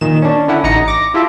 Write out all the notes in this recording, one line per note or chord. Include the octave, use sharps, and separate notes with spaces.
A#2 D#3 E7
C#4 D4
D3 C#4 E4 F#5
A1 D#4 A#5 A#6 C#7
D6 A#6
E4 F4 G4 A4 E5